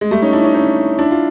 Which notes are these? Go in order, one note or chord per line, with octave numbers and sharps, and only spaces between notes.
G#3
G3 A3
C#4 D#4
D4 E4
C#4 D#4
C#4 D#4
D4 E4
F4